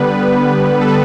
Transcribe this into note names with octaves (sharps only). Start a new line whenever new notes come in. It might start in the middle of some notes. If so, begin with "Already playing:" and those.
Already playing: D3 G3 B3 B4
A4
B4